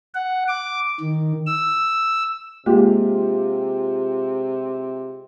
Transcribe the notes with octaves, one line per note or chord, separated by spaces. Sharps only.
F#5
D6
D#3
E6
C3 G#3 A#3 F4 G4